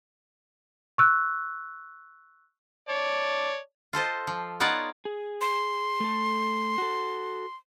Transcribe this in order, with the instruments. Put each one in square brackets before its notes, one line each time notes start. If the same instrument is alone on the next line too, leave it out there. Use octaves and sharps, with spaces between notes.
[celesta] C#6 E6 F#6
[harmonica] C#5 D5 A5
[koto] F4 A4 C5 D#5
F3
B3 D#4 F4 C#5 D5 F#5
[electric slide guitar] G#4
[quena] C6
[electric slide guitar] A3 A4
F#4 A4